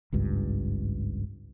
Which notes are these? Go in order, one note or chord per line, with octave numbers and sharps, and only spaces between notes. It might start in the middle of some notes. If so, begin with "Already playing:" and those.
G#1 C#2 G2